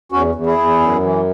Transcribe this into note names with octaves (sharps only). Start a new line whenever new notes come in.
E2 C#4 F#4
E2
E4 G#4
E2
F#2
E3